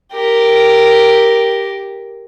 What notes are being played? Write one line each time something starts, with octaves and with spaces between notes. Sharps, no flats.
G4 A#4